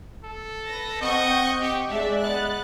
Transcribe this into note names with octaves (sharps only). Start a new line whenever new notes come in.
A4
B4 A#6
C4 D#5 F#5 C#6 G6
G4
G#3 D4 D5 E5
B3 F#6 A6